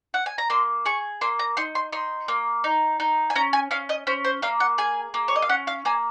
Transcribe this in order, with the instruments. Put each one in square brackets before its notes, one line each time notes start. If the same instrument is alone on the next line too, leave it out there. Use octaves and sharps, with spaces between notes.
[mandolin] F#5
G#5
A#5
A#3 C6
G#4 C#6
A#3 C6
A#5
D#4 C6
C6
D#4 C6
A#3
D#4
D#4
G#5
C#4 A#5
G#5
C#4 F5
D#5
C#4 C5
C5
A#3 F5
F#5
G#4 G#5
A#3
C#5
D#5
F5
C#4 F#5
F5
A#3 G#5